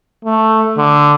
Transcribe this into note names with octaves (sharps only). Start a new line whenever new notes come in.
A3
D3